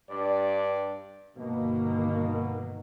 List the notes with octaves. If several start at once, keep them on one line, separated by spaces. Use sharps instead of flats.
G2 D5
G1 B2 D#3 A#3